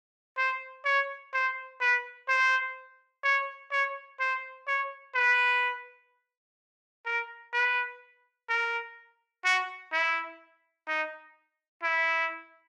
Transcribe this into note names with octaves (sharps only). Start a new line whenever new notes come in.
C5
C#5
C5
B4
C5
C#5
C#5
C5
C#5
B4
A#4
B4
A#4
F#4
E4
D#4
E4